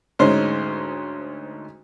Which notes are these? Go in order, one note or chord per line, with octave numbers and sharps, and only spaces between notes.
D2 G#2 G#3 C#4 C5